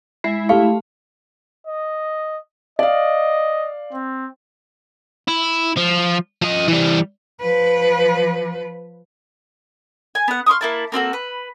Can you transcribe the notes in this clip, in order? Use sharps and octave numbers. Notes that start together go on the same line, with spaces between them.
G#3 E4 E5
A3 G4 A4 F5 C#6
D#5
D5 D#5 F5
C4
E4
F3
F3 D#5
E3 G3
F3 B4
G#5
B3 F#5
F5 C6 C#6 D#6
A#3 E4 A5
A#3 C4 F#4 A4
B4